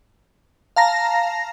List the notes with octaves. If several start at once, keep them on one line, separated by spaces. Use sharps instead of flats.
F5 A5 A#5 A#6